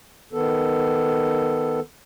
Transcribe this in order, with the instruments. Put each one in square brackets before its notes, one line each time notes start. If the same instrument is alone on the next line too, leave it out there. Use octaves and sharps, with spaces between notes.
[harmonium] D#3 B3 A4